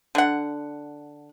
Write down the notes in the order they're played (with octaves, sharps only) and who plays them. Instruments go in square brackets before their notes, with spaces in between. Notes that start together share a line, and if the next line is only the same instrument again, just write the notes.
[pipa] D3 F#5